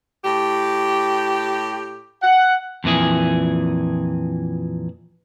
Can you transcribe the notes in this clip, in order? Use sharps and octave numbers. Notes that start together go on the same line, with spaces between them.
A2 G4
F#5
F2 A#2 E3 G#4